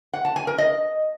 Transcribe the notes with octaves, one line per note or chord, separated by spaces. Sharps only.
F#5
A5
G#5
A#4
D#5